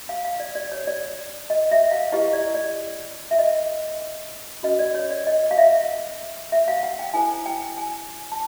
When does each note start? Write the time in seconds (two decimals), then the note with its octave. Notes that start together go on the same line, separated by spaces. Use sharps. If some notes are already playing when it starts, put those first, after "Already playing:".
0.09 F5
0.25 F5
0.40 D5
0.55 D5
0.72 C#5
0.87 D5
1.50 D#5
1.71 E5
1.91 F5
2.12 E4 G4 B4 D#5
2.33 D5
2.54 D5
3.31 E5
3.39 D#5
4.63 C#4 F#4 B4 D#5
4.79 D5
4.95 C#5
5.10 D5
5.27 D#5
5.51 F5
5.58 E5
6.52 E5
6.68 F5
6.83 F#5
6.99 G5
7.14 E4 A4 C5 G#5
7.46 G5
7.77 G#5
8.32 A5